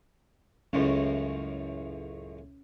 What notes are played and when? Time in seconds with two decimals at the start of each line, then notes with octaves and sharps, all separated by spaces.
0.73 C#2 F#2 A2 C#4